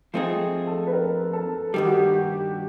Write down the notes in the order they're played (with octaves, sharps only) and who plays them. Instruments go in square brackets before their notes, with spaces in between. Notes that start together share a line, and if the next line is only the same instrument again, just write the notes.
[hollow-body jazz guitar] F3 A3 C4 D#4 G#4 [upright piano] F4
[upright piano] A4
B4
A#4
A4
[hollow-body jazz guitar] G2 D#3 G3 [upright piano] G4
[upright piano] F#4
G4